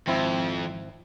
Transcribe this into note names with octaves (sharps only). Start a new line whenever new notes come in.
G#1 F2 C4 E4